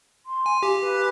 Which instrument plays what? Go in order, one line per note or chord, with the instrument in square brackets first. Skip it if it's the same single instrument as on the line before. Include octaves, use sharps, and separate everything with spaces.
[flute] C6
[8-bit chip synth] G#5
[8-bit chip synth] G4 [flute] F5
[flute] B4